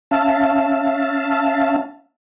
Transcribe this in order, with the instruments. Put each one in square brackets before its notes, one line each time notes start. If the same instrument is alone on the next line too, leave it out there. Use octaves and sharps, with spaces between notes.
[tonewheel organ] C#4 E5 F5 A5